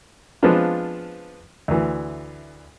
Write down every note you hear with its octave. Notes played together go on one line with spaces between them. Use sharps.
F3 G#3 B3 C4 D4 F4
D2 E3